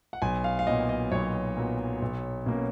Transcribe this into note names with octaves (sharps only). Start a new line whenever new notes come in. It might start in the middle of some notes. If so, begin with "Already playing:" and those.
F#5
B1 G#5
F5
F5
A#2 F#3 B3 D#5
D#5
B1 C#5
A#2 F#3 B3
B1
B2 A#3 C#4